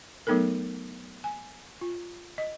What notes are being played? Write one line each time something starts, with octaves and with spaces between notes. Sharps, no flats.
F#3 A3 B3 D#4 A4 A#4
G#5
F4
D#5